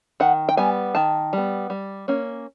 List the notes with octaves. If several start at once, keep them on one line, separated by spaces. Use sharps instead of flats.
D#3 F#5
G5
G3 B3 G#5
D#3 A5
G3 B3
G3
A#3 C#4